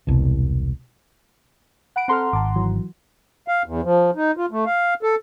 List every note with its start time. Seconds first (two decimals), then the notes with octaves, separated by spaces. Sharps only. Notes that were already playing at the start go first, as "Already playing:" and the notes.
0.07 E1 C2 B2
1.96 F#5 B5 D7
2.08 C4 A4 F#5 A#5 C6 F6
2.33 G#1 A5 D6
2.56 E3 F#3
3.48 F5
3.66 E2
3.83 F3
4.16 D#4
4.37 F4
4.51 A3
4.66 F5
5.03 A4